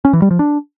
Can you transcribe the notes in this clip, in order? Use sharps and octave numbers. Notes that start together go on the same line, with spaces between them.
C#4
E3
G3
F3
D4